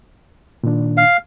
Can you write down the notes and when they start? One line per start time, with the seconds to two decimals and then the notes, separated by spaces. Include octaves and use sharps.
0.63 A#2 D#3 D4
0.97 F5